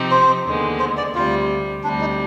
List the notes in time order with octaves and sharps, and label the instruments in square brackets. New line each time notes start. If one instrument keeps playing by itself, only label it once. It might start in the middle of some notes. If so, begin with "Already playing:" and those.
Already playing: [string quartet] C3 F3 C4 D#4 G4
[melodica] C5
[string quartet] D#2 D3 G#3 B3
[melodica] C5
D5
[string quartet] D2 C3 G3 [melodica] F4
[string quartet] D2 C3 G3 [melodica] D4
[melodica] D#4